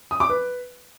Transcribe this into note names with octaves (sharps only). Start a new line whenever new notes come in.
D#6
D6
B4